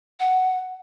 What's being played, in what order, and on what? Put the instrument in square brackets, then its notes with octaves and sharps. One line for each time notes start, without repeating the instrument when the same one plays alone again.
[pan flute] F#5